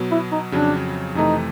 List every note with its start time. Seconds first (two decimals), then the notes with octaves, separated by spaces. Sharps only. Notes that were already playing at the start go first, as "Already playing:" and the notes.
Already playing: B2 F#3 B3
0.11 E4
0.32 D#4
0.52 F2 C#3 F#3 D4
1.15 F2 C3 E3 A3 D#4